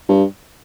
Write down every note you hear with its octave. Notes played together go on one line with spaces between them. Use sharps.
G2